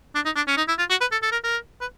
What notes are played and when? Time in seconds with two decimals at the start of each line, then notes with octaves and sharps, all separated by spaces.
0.15 D4
0.25 D#4
0.36 D4
0.47 C#4
0.57 D#4
0.68 E4
0.78 F4
0.90 F#4
1.01 B4
1.12 A4
1.22 A4
1.32 A#4
1.44 A#4
1.81 B4